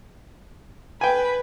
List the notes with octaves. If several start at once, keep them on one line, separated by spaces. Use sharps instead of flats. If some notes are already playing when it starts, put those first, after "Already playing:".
B4 G5 G#5